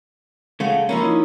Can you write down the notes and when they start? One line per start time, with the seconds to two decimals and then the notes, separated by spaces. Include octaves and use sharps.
0.60 C#3 G#3 A3 C#5 F5 F#5
0.89 F3 A#3 C#4 A#5 B5 E6
1.02 D#4 E4 D#5